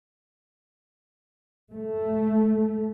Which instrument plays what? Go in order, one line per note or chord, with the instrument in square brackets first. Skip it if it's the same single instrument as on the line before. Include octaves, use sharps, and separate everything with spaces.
[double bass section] A3